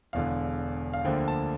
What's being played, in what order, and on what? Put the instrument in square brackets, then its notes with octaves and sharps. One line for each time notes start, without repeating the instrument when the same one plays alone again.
[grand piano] E1 E2 D3 F5
F5
D2 D3 F3 A#3 D4 G5
A5